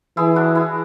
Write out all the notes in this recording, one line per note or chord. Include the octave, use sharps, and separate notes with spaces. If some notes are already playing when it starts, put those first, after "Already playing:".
E3 E4 G#4
D4 F#4
E4 G#4